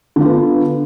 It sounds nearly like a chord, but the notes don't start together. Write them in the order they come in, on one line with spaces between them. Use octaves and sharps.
D3 F4 B3